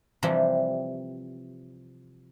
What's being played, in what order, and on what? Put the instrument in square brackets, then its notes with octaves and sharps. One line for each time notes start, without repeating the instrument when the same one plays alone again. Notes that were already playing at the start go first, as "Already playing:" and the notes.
[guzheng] C3 E3 F3 G3